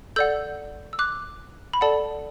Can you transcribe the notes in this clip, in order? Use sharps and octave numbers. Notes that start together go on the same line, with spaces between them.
A4 D5 F#5 E6 G6
E6
D6 F#6
B5
A4 D5 F#5 A5